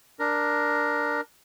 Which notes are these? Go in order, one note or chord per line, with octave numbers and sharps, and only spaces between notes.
D4 A#4